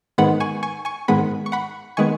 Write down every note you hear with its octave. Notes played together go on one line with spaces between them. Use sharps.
G#2 D#3 G#3 B3 F#5 B5
G#5 C#6
G#5 C#6
G#5 C#6
G#2 D#3 G#3 B3 F#5 B5
C#6
F#5 B5
D#3 G#3 B3 G#5 C#6